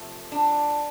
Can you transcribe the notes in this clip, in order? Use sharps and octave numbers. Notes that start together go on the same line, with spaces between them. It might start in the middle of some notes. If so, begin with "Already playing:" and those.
Already playing: C3 F3 A3
D4